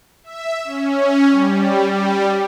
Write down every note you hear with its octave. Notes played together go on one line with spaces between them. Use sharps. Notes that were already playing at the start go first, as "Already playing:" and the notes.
E5
C#4
G3
G3